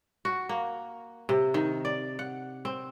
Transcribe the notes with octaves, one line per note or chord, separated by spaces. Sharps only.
F#4
A#3
C3
D#3
D5
F#5
C4